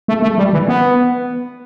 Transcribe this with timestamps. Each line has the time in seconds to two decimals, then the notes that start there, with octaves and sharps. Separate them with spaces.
0.08 A3
0.22 A3
0.38 G3
0.53 E3
0.68 B3